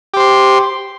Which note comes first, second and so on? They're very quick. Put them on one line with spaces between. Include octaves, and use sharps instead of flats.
G4 C5 C6